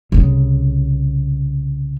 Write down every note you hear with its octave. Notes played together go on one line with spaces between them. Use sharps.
C2 C#3